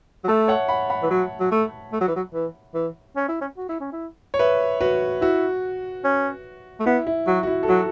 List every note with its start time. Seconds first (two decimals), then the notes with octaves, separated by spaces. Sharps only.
0.24 F#3
0.28 A3 E5 A5
0.48 C#5 F#5
0.68 F#5 B5
0.90 F#5 B5
1.02 E3
1.10 F#3
1.40 F#3
1.51 A3
1.92 A3
2.01 F#3
2.07 E3
2.16 F#3
2.34 E3
2.75 E3
3.16 C#4
3.28 E4
3.41 C#4
3.57 F#4
3.69 E4
3.81 C#4
3.92 E4
4.34 C#5
4.39 B4 E5
4.81 F#4 B4
5.21 E4 F#4
6.04 C#4
6.80 A3
6.86 B3 E4
7.07 E4
7.27 F#3 F#4
7.43 F#4
7.47 E4
7.63 A4
7.68 F#3 F#4